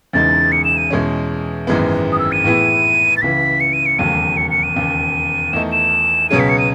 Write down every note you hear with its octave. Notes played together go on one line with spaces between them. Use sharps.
E1 E2 C#3 G#3 D#4 A6
C#7
E7
D#7
E2 B2 G#3 C#4
G#1 F#2 E3 G#3 B3
D#6
E6
D#7
A2 E3 B3 E4 G#4
A6
C#2 C#3 E3 B6
C#7
D#7
C#7
E1 D#2 C#3 F#3 A3 D#7
C#7
C#7
D#7
E1 D#2 C#3
E2 D#3 A3 D#4 E7
E7
C#2 B2 F#3 C#4 G#4 D#7
B6
C#7
D#7